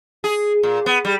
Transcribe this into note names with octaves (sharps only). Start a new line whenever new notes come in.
G#4
A#2
B3
G3